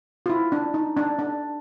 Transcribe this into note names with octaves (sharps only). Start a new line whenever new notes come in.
F4
E4
D4
D#4
D4
D4